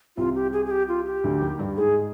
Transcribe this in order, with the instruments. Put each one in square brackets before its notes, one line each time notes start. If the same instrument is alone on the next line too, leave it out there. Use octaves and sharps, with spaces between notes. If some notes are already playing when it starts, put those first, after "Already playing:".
[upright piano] C2 C3 [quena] F4
[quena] G4
G#4
G#4
G4
F4
G4
[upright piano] D2 D3
D#2 D#3
G2 G3
[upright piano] G#2 G#3 [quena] G#4